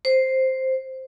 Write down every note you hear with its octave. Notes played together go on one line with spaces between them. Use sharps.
C5